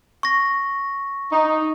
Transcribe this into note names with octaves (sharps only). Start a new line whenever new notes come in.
C#6 A#6
D#4